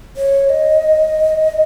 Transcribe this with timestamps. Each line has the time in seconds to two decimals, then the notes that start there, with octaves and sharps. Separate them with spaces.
0.17 C#5
0.49 D#5